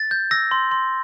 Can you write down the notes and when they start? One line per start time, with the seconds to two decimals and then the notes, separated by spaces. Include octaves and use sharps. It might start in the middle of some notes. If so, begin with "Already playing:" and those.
Already playing: A6
0.11 G6
0.31 E6 A#6
0.51 C6
0.71 C6